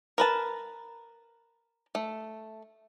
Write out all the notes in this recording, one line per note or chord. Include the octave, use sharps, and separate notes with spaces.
A#4 B4 A5
A3